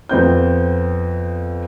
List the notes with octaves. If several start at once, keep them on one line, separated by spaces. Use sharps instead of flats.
F2 B3 C4 G6